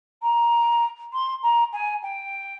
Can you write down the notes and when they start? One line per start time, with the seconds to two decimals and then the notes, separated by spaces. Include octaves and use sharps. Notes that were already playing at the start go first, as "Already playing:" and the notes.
0.22 A#5
1.12 C6
1.43 A#5
1.73 G#5
2.02 G5